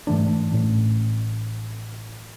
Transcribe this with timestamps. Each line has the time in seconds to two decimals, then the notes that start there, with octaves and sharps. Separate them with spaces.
0.07 G#2 E3 A3 D4
0.52 A1 A2